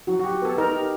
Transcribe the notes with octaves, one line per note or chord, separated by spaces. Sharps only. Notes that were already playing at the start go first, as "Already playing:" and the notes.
F#3 F#4
F#4
G4
B3 A4
D#4 A#4
G4